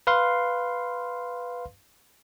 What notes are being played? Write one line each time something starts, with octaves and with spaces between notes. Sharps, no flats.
B4 F5 C6